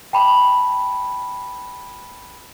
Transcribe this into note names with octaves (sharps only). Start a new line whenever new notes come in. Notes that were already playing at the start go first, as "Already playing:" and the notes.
G5 A5 B5